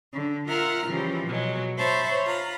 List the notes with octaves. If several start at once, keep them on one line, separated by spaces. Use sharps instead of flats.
D3
F4 A#4 E5 F#5 A#5 F6
C#3 E3 F3 G3
B2 F#3 G#3
C5 C#5 E5 A5 B5
F4 A#5 B5